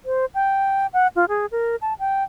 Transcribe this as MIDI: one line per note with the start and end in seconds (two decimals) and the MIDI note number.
0.06 0.25 72
0.35 0.87 79
0.93 1.07 78
1.16 1.25 65
1.29 1.46 68
1.52 1.76 70
1.81 1.94 81
1.99 2.24 79